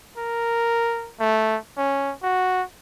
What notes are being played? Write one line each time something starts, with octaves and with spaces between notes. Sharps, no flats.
A#4
A3
C#4
F#4